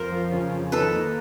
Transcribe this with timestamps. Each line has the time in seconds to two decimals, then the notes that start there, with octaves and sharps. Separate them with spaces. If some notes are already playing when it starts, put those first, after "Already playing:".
Already playing: F2 A#4 C5
0.12 F3
0.32 C#3
0.52 F2
0.72 D#3 A4 B4
0.93 A#3